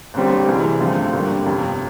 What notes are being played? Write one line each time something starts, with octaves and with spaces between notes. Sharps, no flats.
F#1 F#2 D3 G3 C4
C2 C3 E3 G#3
G2 D3 F3 A3 C4
G#1 G2 D3 G3 A#3
G1 F2 C3